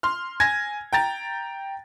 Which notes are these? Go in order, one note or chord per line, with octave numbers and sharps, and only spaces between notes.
C6 F6
G#5 G#6 A#6
G5 A#5 A6